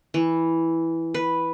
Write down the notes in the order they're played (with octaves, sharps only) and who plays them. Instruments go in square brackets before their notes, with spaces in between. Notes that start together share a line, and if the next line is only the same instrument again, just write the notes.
[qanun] E3
B4